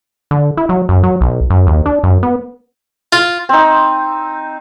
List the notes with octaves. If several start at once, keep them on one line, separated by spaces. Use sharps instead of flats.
D3
E4
F#3
F#2
F#3
B1
F#2
D#2
D4
F#2
B3
F4
C4 D#4